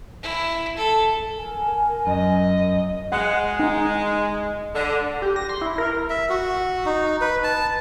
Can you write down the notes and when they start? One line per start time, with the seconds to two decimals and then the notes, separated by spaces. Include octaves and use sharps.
0.23 E4
0.77 A4
1.38 A#4 G#5
2.07 F#2 D#5
3.12 G#3 F#5
3.60 D#4
4.74 D3
5.22 G4
5.36 A#6
5.49 C6
5.61 E4
5.78 A#4
6.10 E5
6.29 F#4
6.86 D#4
7.21 B4
7.44 A5